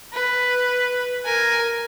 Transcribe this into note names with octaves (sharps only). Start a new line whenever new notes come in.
B4
A#4 G#5